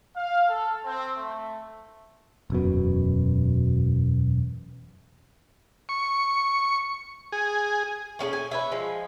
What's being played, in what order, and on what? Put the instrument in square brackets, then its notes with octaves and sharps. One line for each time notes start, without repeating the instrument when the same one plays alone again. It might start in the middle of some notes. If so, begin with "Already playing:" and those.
[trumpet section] F5
A4
C4
A3
[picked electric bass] E1 F#2 B2
[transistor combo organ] C#6
G#4
[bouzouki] A3 C#4 G4 G#4
G#5
B4 C#5 E5
F3 G#3